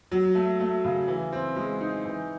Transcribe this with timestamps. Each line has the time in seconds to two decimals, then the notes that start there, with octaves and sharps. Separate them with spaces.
0.11 F#3
0.35 A3
0.60 A3
0.85 C#3
1.08 E3
1.32 C4
1.56 G#3
1.81 D#4
2.05 E3